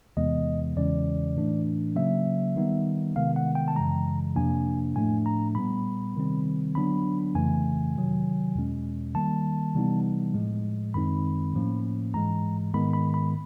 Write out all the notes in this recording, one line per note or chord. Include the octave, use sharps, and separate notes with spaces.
E2 C3 E3 G#3 B3 D#5
E2 C#3 E3 G#3 C#4 D5
A2 E3 A3 D4
C#3 F#3 A#3 C#4 E5
D#3 G3 B3 D#4
C3 D#3 G#3 B3 F5
F#5
G5
A5
F#2 C#3 E3 G#3 A#5
F2 C3 F3 A#3 D4 G#5
A2 F3 A3 D4 G#5
A#5
A#2 G3 B3 B5
C3 D#3 G3 C4
D3 F#3 B3 D4 B5
F2 C#3 E3 A3 G#5
C3 D#3 F#3
E2 B2 G#3 C#4
D#3 G3 A#3 A5
C3 E3 G3 B3 D#4
A2 F3 G#3
F#2 D#3 G#3 C4 D#4 B5
A2 F3 A#3 C#4
G#2 E3 G#3 A#5
G#2 D#3 G#3 B3 B5
B5
B5